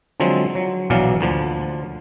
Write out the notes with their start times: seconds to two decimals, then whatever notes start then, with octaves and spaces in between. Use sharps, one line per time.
0.20 D3 F3 F#3 G#3 C4
0.55 F#3
0.90 A#1 B2 E3 F#3 D5 F5
1.21 D2 D3 F3